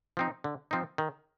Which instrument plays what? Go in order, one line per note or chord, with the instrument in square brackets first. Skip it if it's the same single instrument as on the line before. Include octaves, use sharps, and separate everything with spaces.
[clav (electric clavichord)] F3 C4 D#4
D3
F3 C4 D#4
D#3